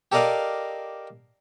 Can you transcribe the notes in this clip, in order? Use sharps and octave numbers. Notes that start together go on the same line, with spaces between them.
G4 A4 A#4 D5 D#5 F5